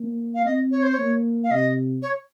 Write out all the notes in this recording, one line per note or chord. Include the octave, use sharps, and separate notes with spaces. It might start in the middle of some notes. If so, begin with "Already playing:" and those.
Already playing: A#3
F5
C4 D#5
C#5
C5
A#3 C#5
F5
C3 D#5
C#5